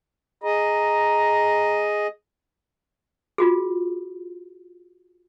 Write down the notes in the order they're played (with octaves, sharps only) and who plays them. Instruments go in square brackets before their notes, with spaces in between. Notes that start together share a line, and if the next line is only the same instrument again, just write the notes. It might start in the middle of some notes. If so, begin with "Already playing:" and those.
[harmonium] G#4 D#5 [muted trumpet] A#5
[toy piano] F4 F#4 G#4